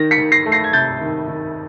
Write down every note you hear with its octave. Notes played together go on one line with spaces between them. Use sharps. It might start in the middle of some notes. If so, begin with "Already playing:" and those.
Already playing: D#3 A#6
B6 C#7
D#3
A#6 C7
A3
A#6 C7
G#6
C3 G6 A6
D#3
D#3